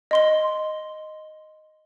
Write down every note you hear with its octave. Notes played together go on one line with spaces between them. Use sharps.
D#5 C6 G7